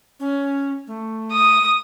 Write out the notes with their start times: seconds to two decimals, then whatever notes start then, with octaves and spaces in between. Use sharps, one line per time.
0.20 C#4
0.87 A3
1.32 D#6